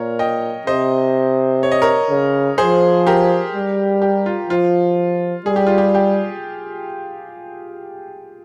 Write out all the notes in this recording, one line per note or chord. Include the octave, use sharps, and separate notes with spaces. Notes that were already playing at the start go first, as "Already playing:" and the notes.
Already playing: A#2 A#4 C#5
D#5 G5
C3 C5 D#5
C#5
D#5
A#4 C#5
C#3
F3 G#4 C5
G4 A#4
G3
G4
F4
F3 F4
G3 G#4
G4
F4
G4
G4